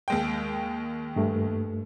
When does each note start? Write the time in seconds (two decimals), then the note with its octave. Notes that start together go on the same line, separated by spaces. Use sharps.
0.08 D#2 G#3 G5
1.16 G2 A3